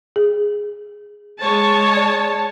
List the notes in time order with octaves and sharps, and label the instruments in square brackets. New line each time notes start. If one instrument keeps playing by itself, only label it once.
[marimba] G#4
[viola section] G#3 C#5 A5
[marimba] D5